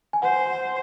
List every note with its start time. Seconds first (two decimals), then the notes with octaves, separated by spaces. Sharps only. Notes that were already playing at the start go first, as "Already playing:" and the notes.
0.13 G#5
0.22 C5 F#5